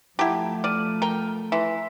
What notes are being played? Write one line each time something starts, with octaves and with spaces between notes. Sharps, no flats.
F3 A3 E4 G4 F#5 A5 A#5
D5 F6 D#7
A#4 G5
E3 E5 A#5 C6